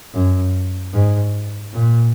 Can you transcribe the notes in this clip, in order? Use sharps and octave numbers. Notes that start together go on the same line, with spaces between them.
F#2
G#2
A#2